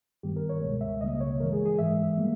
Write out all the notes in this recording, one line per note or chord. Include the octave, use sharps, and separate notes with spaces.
G2 D#3 G3 B3 G4
A#4
C#5
C#2 B2 G#3
E5
C#2 C#3 G3 A#3 D#5
C#5
G2 E3 G#3 A#4
G#4
G#4
G#2 E3 G#3 E5
G3 A#3